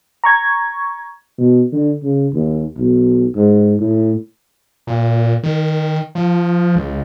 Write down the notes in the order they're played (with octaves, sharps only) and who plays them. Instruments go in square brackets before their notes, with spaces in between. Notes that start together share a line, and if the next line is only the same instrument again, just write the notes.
[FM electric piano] A#5 C#6 G#6
[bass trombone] B2
D3
C#3
D#2
B1
G#2
A2
[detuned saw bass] A#2
D#3
F3
C#2